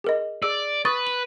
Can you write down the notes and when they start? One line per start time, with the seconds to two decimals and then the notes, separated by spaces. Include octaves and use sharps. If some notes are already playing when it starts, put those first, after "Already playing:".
0.04 G#4 A#4 D#5
0.43 G#4 D5 E6
0.85 B4 C#6 D#6 A6
1.07 F#7